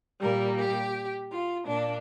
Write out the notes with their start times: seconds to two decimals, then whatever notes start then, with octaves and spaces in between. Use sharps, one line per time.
0.21 A#2 G3 A#3 A#4
0.58 G4
1.30 F4
1.66 A#2 A#3 D4